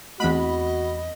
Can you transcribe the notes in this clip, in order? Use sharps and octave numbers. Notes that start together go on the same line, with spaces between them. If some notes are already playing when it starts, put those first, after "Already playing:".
E2 A3 B3 C4 F#4 D#5 B5